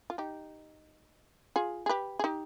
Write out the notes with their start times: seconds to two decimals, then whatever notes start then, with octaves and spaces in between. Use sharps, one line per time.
0.10 F4
0.18 D#4 G4
1.56 F4 G#4
1.86 G#4
1.89 G4 B4
2.19 G#4
2.24 D#4 G4